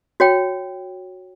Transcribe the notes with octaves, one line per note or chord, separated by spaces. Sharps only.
F#4 C#5 G5